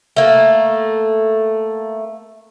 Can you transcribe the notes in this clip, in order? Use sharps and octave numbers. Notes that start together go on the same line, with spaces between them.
A3 A#3